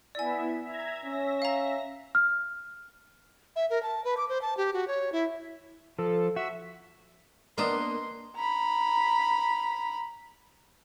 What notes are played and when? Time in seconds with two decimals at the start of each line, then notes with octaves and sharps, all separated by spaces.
0.15 B3 E4 D5 E5 G#5
0.64 E5 A#5 G#6
1.04 C#4 E5 A#6
1.42 F5 A#5
2.15 F6
3.56 E5
3.70 A#4
3.83 A5
4.05 B4
4.17 D6
4.29 C5
4.42 A5
4.57 G4
4.74 F#4
4.88 C#5
5.12 E4
5.99 F3 A4
6.36 F#4 E5
7.58 A#3 B3 D4 A#4 D#5 C6
8.36 A#5 B5